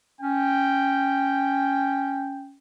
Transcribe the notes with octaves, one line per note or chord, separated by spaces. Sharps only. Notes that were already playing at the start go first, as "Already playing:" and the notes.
C#4 G5